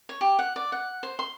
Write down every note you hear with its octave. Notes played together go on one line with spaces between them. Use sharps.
C#5
G4
F#5
D5
F#5
C5
C6